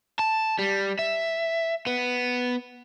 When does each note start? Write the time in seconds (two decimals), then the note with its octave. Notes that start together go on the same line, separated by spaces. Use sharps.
0.19 A5
0.59 G3
0.99 E5
1.87 B3